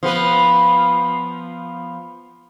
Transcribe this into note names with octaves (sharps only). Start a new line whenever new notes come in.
F3 B3 B4